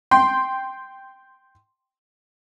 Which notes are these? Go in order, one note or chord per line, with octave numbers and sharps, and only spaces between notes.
G5 C6